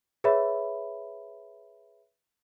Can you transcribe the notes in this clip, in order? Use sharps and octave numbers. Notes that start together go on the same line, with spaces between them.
G#4 B4 C#5 E5 B5